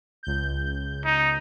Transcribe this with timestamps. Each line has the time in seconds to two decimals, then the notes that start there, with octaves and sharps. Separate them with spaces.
0.23 C#2 G6
1.05 D#4